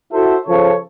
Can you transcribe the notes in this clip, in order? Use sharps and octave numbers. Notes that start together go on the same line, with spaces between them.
E4 F#4 A4 C5 E5
C#3 F3 A4 C#5